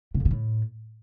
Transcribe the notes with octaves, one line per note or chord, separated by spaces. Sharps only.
C3
F2
C3
A2